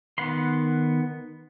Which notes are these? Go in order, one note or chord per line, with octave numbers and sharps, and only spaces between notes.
D#3 B3 F#5 B5 C6